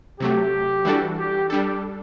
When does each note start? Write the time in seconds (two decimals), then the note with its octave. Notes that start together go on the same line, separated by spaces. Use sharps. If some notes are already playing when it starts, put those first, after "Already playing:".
0.20 C3 F#3 A3 G4
0.85 E3 G3 D4 F#4 A4
1.18 G4
1.50 G3 D4 G4 A4